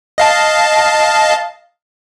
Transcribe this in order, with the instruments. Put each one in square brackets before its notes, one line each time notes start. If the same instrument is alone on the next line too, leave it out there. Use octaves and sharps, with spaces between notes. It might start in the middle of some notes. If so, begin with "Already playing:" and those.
[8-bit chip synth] D#5 F5 A5